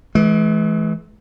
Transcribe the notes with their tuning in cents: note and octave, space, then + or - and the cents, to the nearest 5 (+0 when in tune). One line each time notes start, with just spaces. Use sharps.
E3 +0 G#3 +45